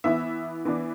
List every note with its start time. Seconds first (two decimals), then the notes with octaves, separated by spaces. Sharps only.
0.04 E3 B3 E4 E5
0.65 E3 B3 D4